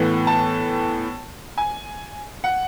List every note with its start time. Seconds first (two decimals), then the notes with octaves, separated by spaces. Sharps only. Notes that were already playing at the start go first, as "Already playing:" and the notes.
Already playing: A2 E3 B3
0.27 A5
1.58 G#5
2.44 F#5